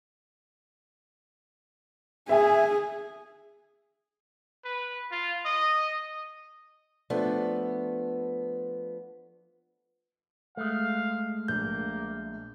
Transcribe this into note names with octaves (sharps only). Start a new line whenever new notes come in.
G#4 E5 G#5
B4
F4
D#5
F3 A3 B3 D4
G#3 A3 F5
A#1 A#3 G6